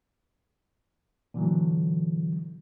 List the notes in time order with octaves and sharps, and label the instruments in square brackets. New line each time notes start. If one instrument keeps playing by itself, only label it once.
[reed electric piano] A#2 D3 E3 F#3